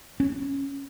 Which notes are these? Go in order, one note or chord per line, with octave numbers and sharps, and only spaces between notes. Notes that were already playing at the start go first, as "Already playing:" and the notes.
C#4